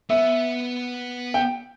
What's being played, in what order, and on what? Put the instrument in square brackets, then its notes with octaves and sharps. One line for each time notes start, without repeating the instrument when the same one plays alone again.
[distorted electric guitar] B3 [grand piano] E5
[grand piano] G5